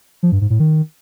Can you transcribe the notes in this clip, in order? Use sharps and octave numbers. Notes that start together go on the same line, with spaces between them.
F3
G2
G#2
A2
D#3